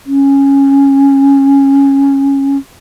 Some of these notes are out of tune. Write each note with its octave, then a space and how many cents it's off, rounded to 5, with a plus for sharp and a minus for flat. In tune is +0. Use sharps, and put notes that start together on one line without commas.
C#4 -10